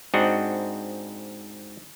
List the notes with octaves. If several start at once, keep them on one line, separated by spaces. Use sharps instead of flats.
G#2 C4 D4 F#4 D#5 F#5